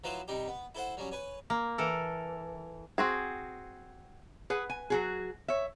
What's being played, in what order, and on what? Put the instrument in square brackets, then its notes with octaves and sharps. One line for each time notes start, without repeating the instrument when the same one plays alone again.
[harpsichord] F3 F#3 E4 B4 C5
C3 G3 D#4 G4
B3
E4 A4 C5 F#5
F#3 G3 C#4
B4 C#5 G#5
[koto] A#3
E3 A4 A#4
[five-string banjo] C4 F#4 G#4
[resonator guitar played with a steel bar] G#4 B4 F#5
G#5
F#3 F#4 G#4
C#5 E5